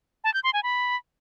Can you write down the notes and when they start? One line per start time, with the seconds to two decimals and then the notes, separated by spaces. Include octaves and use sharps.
0.24 A5
0.34 G6
0.44 C6
0.53 G#5
0.63 B5